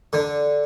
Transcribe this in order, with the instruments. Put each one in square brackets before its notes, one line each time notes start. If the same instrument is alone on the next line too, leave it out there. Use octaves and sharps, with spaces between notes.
[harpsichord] D3